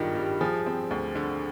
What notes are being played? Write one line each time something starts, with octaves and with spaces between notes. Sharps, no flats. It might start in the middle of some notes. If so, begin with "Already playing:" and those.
Already playing: G#1 G2 D#3 F4 G4 G#4
G3
F3 G#4
C4
D2
D3